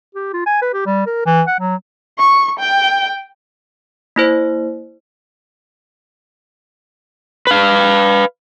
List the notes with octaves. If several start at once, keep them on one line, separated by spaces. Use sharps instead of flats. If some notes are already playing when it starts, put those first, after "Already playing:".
G4
F4
G#5
B4
G4
G3
A#4
E3
F#5
F#3
C#6
G5
A#3 E4 C5
B4 F5